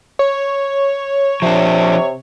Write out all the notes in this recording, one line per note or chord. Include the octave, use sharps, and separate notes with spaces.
C#5
C3 F3 D4